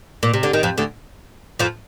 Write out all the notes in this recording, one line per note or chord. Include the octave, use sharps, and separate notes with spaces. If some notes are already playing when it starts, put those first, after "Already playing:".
A#2
C3
D3
D#3
F2 F3
D2 D3
F2 F3